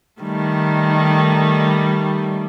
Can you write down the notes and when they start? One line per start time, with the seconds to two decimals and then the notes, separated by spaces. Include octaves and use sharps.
0.21 D#3 G3 A3